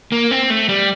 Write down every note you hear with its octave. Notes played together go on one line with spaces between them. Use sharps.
A#3
C4
A3
G3